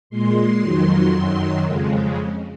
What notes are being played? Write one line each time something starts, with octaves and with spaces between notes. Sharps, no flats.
A#2 G#3 C6
F2 D#3 F#3
F#2 D#3 F#3
F2 C#3 G#3